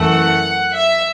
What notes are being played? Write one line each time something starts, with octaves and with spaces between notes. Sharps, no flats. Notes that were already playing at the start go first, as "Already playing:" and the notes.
Already playing: F#2 E3 A3 F#5
E5